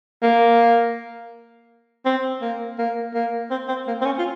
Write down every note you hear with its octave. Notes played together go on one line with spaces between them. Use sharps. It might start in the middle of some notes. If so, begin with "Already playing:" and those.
A#3
C4
A#3
A#3
A#3
C4
C4
A#3
C4
C#4
F4